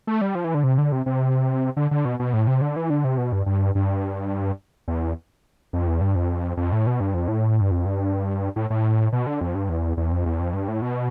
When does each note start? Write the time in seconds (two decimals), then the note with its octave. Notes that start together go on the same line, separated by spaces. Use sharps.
0.07 A3
0.21 G3
0.35 F3
0.44 E3
0.54 D3
0.64 C3
0.78 D3
0.92 C3
1.06 C3
1.77 D3
1.91 D3
2.05 B2
2.19 B2
2.33 A2
2.47 C3
2.61 D3
2.76 E3
2.90 D3
3.04 C3
3.18 B2
3.32 G2
3.46 G2
3.75 G2
4.88 E2
5.73 F2
5.87 E2
6.01 G2
6.16 F2
6.57 F2
6.72 A2
6.87 B2
7.00 G2
7.14 F2
7.28 A2
7.61 G2
7.71 F2
7.85 G2
8.56 A2
8.70 A2
9.13 B2
9.27 D3
9.41 F2
9.55 G2
9.69 E2
9.97 E2
10.11 F2
10.26 E2
10.39 F2
10.54 G2
10.68 A2
10.82 B2